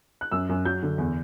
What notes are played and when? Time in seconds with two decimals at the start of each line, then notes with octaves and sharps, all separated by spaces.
0.21 F#6
0.32 F#2 E6
0.49 F#2
0.65 F#3 G6
0.83 D3
0.98 E2